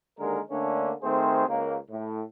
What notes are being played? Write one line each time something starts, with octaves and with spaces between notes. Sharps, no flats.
D#2 D3 G#3 A#4
D3 A3 A#3 C#4 D4
D#3 A3 C4 G#4 C5
C#2 A#3
A2